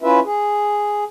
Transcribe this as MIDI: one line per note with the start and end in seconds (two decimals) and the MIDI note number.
0.03 0.20 61
0.03 0.20 64
0.03 0.20 65
0.03 0.20 71
0.03 0.20 76
0.25 1.04 68